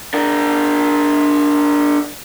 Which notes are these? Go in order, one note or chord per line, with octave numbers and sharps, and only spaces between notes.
D4 A#4